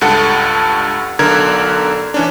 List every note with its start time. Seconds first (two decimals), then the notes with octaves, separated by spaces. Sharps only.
0.01 C#2 G2 A4 F#5
1.19 B1 D3 A#4 G#6
2.14 E3 C#4 D4